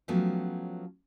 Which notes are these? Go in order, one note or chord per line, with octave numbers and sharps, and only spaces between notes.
F3 F#3 A3 B3 C#4 G4